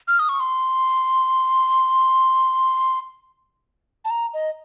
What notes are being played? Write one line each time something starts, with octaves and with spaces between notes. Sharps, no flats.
F6
D#6
C#6
C6
A5
A#5
D#5